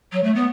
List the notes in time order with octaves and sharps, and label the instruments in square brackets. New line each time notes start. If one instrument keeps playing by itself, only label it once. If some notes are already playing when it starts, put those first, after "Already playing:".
[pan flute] F#3
A3
B3